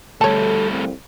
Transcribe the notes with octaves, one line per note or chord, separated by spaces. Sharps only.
D2 G3 A3 A4 C#5 A5
C2 F2